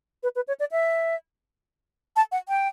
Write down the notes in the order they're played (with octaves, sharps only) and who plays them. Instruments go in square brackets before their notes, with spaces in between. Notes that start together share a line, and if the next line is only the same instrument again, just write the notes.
[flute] B4
B4
C#5
D5
E5
A5
F#5
G5